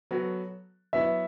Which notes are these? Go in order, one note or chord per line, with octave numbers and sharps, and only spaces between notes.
F#3 B3 F#4 A4
F#3 B3 E4 E5